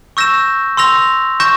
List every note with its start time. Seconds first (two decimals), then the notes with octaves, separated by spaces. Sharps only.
0.17 C#6 E6 G6 A#6 E7
0.77 C6 E6 A#6 F7
1.40 C#6 G6 A#6 E7